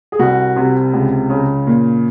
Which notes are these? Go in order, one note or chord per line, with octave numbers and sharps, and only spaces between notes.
G#4
C2 F#4
C3
C#2
C#3
A#2